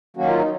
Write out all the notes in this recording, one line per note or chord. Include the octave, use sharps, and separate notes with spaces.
D#3 F#3 A#3 C#4 F#4
F4
D#4